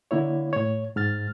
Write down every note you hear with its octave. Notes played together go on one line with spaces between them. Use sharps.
D3 A#3 E4 C#5
A2 C#5
G#2 F6 A6